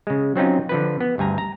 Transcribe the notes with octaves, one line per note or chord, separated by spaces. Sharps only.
C#3 G#3
F#3 C4 C#4 D#4 F4
D3 F3 B4
B3
D2 G2 G#5 A#5
A#5